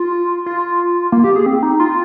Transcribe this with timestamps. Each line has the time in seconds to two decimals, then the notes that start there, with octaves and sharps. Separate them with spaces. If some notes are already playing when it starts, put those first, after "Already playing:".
Already playing: F4
0.46 F4
1.12 A#3
1.24 G4
1.36 G#4
1.46 C4
1.63 D#4
1.80 F4